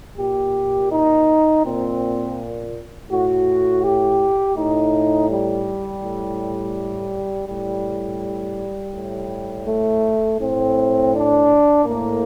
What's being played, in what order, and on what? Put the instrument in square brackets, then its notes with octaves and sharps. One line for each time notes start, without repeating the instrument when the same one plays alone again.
[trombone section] A#2 G4
D#4
A#2 C4
A2 F#4
G4
A2 D#4
G3
A2
A2 G3
A2
A3
A2 C4
D4
A2 A#3